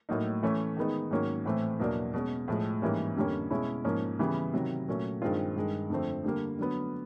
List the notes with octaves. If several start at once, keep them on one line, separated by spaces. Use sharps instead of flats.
A2 F#3 A#3 D#4
E3 A3 C#4
D#3 G#3 B3 D#4
G#2 D#3 F#3 A#3 C#4
A2 E3 A3 C4
E2 B2 F#3 A#3 D4
B2 G#3 C#4
A2 F3 G#3
G#2 E3 G3 A#3 C#4
F2 D3 G3 A#3 C#4
B2 G#3 C#4 E4
G#2 F3 A#3 C#4
C#3 E3 G3 B3
C3 D#3 F#3
A#2 F#3 A3 C#4
G2 D#3 G#3 C4 F4
G2 D#3 G#3
F2 D3 F3 A3 C4
D3 G3 A#3
D3 F#3 B3